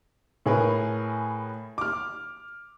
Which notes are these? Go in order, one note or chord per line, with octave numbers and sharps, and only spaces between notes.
A2 G#4 A#4 B4
D6 F6